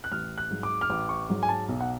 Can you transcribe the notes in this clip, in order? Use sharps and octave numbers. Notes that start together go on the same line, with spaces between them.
F#6
A1 F6
F#6
G#2 F#3
D6
F6
A1 D6
C#6
G#2 F#3
G#5
A5
B1
F#5